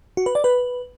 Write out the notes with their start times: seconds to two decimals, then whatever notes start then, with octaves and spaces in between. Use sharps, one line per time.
0.17 F#4
0.26 B4
0.35 D5
0.44 B4